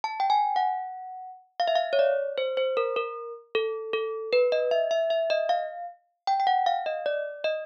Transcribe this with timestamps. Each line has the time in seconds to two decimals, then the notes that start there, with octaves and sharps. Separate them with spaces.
0.04 A5
0.20 G5
0.30 G#5
0.56 F#5
1.60 F5
1.68 E5
1.75 F5
1.93 C#5
1.99 D5
2.38 C5
2.57 C5
2.77 A#4
2.96 A#4
3.55 A4
3.93 A4
4.33 B4
4.52 D#5
4.71 E5
4.91 E5
5.10 E5
5.30 D#5
5.49 F5
6.27 G5
6.40 G5
6.47 F#5
6.66 F5
6.86 D#5
7.06 D5
7.44 D#5